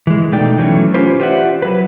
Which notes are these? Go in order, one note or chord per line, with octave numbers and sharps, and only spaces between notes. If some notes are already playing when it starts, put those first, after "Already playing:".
E3 G#3
B2 A3 D#4 D5 G5
E3 F#3 A3 B3 C#4
C#4 F4 G4 B4 C5
F4 G4 C5 D5 E5 F#5
F#3 B4